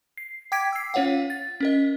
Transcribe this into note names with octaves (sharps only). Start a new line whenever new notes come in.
C7
G5 D6 G#6 B6 D7
E6 C7
C#4 F4 C#5 F5 F#5
A6
C#4 A#4 D#5